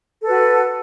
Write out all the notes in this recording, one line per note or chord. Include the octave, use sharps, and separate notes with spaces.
F#4 A4 B4